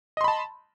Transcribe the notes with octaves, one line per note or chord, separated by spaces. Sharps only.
D#5 A5 B5 C6